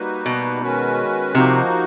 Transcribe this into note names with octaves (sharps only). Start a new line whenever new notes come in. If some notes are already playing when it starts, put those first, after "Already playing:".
Already playing: G3 A#3 D#4 F#4 B4
B2
D#3 G#3 C#4 F#4 B4
C3 F3 A#3 D#4 F#4